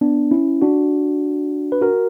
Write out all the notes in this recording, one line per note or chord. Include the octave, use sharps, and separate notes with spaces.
B3 D4
C#4 E4
D4 F#4
B4
F#4 A#4